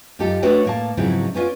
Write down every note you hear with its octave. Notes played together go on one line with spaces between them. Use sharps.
F#2 D#4 F4 G4 A4
A3 D4 F#4 B4 C#5 G5
A2 A#3 A5
G#2 C#3 F3 F#3 C4 E4
B3 C#4 D4 F4 D5